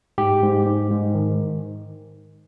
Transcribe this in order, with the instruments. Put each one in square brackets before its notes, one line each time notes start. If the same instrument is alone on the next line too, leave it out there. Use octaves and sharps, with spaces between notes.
[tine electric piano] G#2 G4
G#2
G#2
G#2
D#3